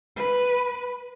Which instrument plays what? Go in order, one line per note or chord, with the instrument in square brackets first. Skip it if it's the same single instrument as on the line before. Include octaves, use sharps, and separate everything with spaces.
[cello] B4